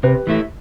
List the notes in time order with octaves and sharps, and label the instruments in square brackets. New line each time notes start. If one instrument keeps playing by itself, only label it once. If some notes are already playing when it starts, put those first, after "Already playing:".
[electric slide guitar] C3 [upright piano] G4 B4
[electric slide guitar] E3 A3 E4